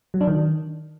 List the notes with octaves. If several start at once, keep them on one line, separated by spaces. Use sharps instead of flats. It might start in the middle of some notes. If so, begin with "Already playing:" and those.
F#3
D4
D#3